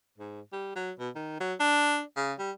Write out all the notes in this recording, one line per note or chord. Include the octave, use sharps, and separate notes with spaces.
G#2
G3
F#3
B2
D#3
F#3
D4
C#3
G3